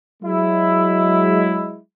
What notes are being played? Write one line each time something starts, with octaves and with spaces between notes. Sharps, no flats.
F#3 G#3 E4